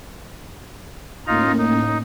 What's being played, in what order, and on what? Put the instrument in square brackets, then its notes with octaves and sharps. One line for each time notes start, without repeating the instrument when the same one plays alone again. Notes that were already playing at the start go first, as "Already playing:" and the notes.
[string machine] A2 A#3 C#4 [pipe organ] D#4 F4 A#5
[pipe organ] D#4